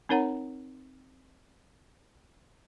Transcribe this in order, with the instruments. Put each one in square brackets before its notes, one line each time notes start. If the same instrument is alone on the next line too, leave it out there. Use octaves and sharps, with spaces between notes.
[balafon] C4 D#4 A#4 C#5 F#5 A#5